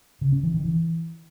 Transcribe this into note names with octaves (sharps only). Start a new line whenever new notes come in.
C#3
C#4
E3
D#3
E3